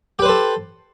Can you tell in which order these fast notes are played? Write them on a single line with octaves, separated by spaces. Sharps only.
G4 B4 C5 A4